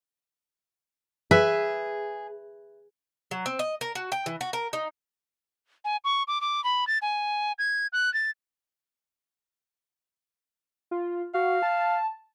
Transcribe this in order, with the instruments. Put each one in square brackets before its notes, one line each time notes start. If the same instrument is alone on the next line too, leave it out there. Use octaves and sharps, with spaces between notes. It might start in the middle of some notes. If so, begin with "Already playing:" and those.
[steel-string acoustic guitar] G#4 [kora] B4 E5
[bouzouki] F#3
C4
D#5
A#4
F#4
G5
E3
F#4
A#4
D#4
[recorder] G#5
C#6
D6
D6
B5
A6
G#5
G#6
F#6
A6
[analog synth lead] F4
[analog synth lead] F#4 [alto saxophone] F5
[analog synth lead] A5